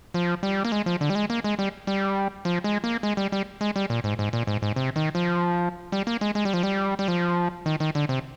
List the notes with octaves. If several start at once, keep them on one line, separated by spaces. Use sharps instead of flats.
F3
G3
A#3
G#3
F3
D3
G3
G#3
A#3
G#3
G3
G3
F3
G#3
A#3
G#3
G3
G3
G#3
G3
A#2
G#2
G#2
A#2
G#2
G#2
C3
D#3
F3
G3
A#3
G#3
G#3
G3
F3
G3
G3
F3
D#3
D#3
D3
C3